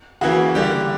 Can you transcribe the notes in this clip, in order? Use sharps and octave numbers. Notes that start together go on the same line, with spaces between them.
C#3 E3 A#3 F#4
D3 G3 A#3 G4